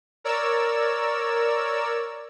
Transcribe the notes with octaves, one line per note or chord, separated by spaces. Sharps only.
A#4 C#5 D5 E6